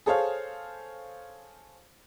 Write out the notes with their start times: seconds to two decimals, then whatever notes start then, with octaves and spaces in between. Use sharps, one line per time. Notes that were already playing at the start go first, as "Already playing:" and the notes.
0.06 G#4 A4 C5 C#5 F5